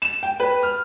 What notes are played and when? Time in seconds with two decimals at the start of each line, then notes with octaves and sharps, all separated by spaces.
0.02 E7
0.23 G5
0.40 B4
0.63 F6